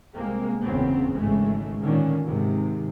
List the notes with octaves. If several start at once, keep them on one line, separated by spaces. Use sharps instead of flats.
C2 G#3 A#3 C4
F#1 E2 A#2 C#3 B3 C4
G#1 C#3 E3 G#3 A3
A#2 D3 D#3 C#4
G#2 C3 D#3